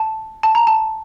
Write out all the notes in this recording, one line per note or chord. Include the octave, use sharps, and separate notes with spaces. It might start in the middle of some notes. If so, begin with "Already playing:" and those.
Already playing: A5
A5
A#5
A5